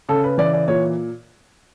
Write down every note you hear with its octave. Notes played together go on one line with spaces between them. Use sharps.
C#3 A4
B4
E3 D5
D5
A#2 C#5